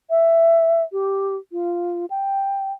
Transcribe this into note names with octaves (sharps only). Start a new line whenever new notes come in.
E5
G4
F4
G5